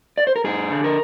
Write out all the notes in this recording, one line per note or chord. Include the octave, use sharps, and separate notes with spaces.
D5
C5
A#4
G2 G#4
D3
A#4